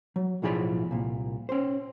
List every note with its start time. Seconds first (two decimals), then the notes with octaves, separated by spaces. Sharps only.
0.16 F#3
0.42 B1 A2 F3 G#4 D5 B5
0.91 C2 A#2
1.49 C#4 C5